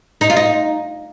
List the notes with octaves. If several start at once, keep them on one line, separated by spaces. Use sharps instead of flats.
D#4
F4
D#4